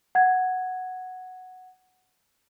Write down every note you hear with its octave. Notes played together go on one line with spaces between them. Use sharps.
F#5 G#6